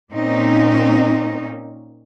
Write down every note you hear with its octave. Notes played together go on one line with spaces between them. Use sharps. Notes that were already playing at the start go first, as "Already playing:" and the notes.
A#2 A#3 C4 C#4 D#4